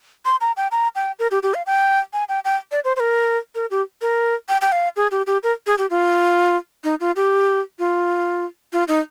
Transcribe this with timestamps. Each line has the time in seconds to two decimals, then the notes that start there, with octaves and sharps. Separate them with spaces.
0.25 C6
0.41 A#5
0.57 G5
0.72 A#5
0.95 G5
1.19 A#4
1.31 G4
1.43 G4
1.54 F5
1.66 G5
2.13 G#5
2.29 G5
2.45 G5
2.72 D5
2.85 C5
2.96 C5
3.00 A#4
3.55 A#4
3.71 G4
4.01 A#4
4.49 G5
4.61 G5
4.72 F5
4.96 G#4
5.11 G4
5.27 G4
5.43 A#4
5.67 G#4
5.78 G4
5.90 F4
6.84 D#4
7.00 F4
7.16 G4
7.79 F4
8.73 F4
8.88 D#4